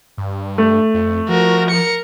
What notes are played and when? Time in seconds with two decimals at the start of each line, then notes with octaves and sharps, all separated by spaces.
0.17 G2
0.58 A3
0.94 F2
1.29 F3 F#4 A#4
1.71 A#4 C#7